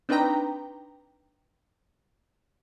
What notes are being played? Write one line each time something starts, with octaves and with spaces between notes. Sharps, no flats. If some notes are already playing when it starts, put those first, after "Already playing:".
C4 D4 D#4 B4 G5 A#5